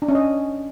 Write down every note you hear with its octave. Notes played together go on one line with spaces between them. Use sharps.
D4
C#4
D#5